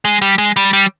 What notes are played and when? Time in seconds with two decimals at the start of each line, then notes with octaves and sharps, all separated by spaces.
0.05 G#3
0.22 G3
0.38 G#3
0.56 G3
0.73 G3